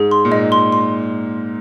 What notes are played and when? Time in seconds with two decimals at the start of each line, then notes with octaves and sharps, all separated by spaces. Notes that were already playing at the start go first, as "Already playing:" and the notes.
Already playing: G#2 G#4
0.11 C6
0.25 A#2
0.32 G#2 D#5
0.52 C6
0.72 C6